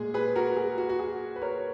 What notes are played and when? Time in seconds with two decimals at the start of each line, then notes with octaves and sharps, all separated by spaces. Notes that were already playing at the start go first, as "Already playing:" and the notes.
Already playing: A#2 G#3 G#4
0.14 G#4 B4
0.36 F#4 A#4
0.57 G#4
0.78 F#4
0.89 F#4
0.99 G#4
1.36 B4
1.42 A#4 C#5